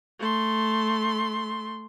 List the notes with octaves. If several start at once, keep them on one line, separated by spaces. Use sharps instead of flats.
A3 C6